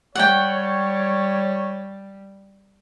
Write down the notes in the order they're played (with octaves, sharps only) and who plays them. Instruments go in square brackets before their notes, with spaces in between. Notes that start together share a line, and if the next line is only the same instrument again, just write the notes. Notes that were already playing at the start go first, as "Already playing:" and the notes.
[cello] G3 [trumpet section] C#5 [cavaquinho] F#5 G5